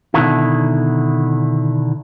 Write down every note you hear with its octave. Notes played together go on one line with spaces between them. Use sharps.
B2 D3 D#3 E4